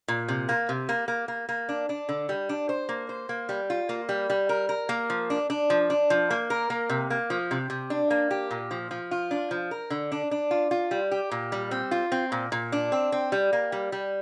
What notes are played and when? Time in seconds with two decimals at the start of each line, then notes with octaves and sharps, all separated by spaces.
0.08 A#2
0.28 C3
0.49 A#3
0.69 C3
0.89 A#3
1.08 A#3
1.28 A#3
1.49 A#3
1.69 D4
1.89 D4
2.09 D3
2.29 G3
2.49 D4
2.69 C5
2.89 A#3
3.09 C5
3.29 A#3
3.49 G3
3.70 F4
3.89 A#3
4.09 G3
4.30 G3
4.49 A#4
4.69 A#4
4.89 A#3
5.10 F3
5.30 D4
5.50 D4
5.70 F3
5.90 D4
6.10 F3
6.30 A#3
6.50 A#4
6.70 A#3
6.90 C3
7.10 A#3
7.30 F3
7.51 C3
7.70 C3
7.90 D4
8.11 A#3
8.31 G4
8.51 A#2
8.71 F3
8.91 F3
9.11 F4
9.31 D4
9.51 F3
9.71 A#4
9.90 D3
10.12 D4
10.31 D4
10.51 F4
10.71 F4
10.91 G3
11.11 G4
11.32 A#2
11.52 G3
11.71 C4
11.91 F4
12.12 C4
12.32 A#2
12.52 A#2
12.72 D4
12.92 C4
13.12 C4
13.32 G3
13.53 A#3
13.72 G3
13.92 G3